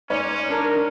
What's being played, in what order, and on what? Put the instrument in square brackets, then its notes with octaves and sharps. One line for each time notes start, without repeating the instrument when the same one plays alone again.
[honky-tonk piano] G#2 C#5 D5 [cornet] C#4
[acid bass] D4 [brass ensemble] A#4